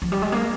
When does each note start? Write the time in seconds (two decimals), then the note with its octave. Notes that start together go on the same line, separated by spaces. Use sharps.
0.02 F3
0.12 G3
0.22 G#3
0.32 A#3